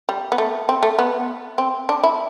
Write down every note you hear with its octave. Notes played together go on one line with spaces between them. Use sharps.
G3
B3
A3
C4
A3
B3
C4
D4
E4